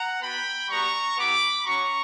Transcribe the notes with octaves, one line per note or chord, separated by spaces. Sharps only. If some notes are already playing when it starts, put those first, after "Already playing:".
Already playing: F#5 A#5
B3 F#4 G5 B5
G3 B3 F#4 A#5 C#6
B3 E4 G4 B5 D6
C#4 F#4 A#5 C#6